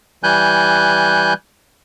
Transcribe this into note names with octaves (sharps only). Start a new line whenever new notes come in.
E3 G3 G#5 F#6 G6